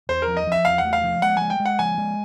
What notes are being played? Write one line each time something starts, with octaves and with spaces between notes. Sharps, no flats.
E2 C5
A#4
F3
D#5
F3
E5
E2 F5
F#5
A3
F5
F3
G#3 F#5
G#3 G#5
G5
G#3
F#5
F3 G#5
G#3